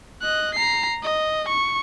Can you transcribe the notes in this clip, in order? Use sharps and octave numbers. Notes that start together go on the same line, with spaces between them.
D#5 F#6
A#5 C7
D#5
C#6